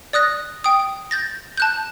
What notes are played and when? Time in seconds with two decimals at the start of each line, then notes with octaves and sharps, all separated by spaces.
0.13 D5 D#6 F#6 A#6
0.64 G5 D#6
1.11 G6 A6 A#6
1.58 A5 F#6 G6